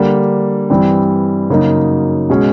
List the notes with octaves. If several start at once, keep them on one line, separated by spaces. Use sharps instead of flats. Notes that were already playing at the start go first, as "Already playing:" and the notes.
Already playing: D3 G3 A#3 D4
G2 E3 G3 C4
F#2 C#3 F#3 A#3 D#4
B2 G#3 C#4